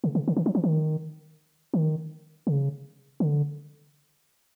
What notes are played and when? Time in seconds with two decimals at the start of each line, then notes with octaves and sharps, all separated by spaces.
0.04 C#3
0.15 C#3
0.28 D3
0.37 D#3
0.46 F3
0.55 E3
0.64 D#3
1.74 D#3
2.47 C#3
3.20 D3